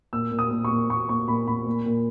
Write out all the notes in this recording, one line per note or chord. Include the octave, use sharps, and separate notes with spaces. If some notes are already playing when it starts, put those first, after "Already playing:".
A#2 E6
A#2
D#6
A#2
C#6
A#2
A#2 C#6
A#2 C#6
A#2 B5
A#2 B5
A#2
A#2